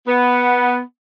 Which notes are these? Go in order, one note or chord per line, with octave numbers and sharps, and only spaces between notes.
B3